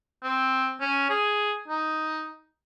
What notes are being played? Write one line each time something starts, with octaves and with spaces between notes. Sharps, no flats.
C4
C#4
G#4
D#4